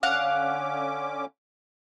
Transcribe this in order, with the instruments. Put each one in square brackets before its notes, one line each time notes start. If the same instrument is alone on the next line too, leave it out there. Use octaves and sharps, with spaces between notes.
[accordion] D3 C#4 D6 [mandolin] F5 F#5